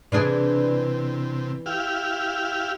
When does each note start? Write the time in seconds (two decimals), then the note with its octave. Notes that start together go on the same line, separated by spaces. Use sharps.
0.12 C3 E3 D4 G#4
1.66 E4 G4 F5